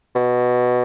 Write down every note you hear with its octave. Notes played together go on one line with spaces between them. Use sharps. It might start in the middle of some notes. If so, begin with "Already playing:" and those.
B2